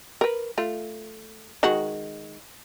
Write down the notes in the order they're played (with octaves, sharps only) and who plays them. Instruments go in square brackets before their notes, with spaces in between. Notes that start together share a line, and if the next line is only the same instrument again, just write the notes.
[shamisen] A#4 B4
A3 F4
D#3 G#3 F#4